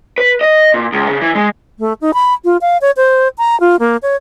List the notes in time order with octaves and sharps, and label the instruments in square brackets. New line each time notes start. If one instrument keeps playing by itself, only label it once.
[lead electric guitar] B4
D#5
A#2
C#2
C#3
E3
G#3
[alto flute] A3
D#4
B5
F4
F5
C#5
C5
A#5
F4
A#3
C#5